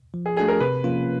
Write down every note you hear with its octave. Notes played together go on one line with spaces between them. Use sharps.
F3
G#4
A3 D4 F#4 G#4 A4
A#4
C3 B4
F3 A#3 C#4 F4